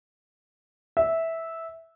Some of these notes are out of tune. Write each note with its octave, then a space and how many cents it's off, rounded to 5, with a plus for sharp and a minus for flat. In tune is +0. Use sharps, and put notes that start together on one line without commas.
E5 -10